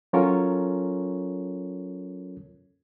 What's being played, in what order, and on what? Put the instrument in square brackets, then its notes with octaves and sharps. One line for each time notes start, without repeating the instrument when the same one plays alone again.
[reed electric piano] F#3 C#4 F4 A4 A#4 C#5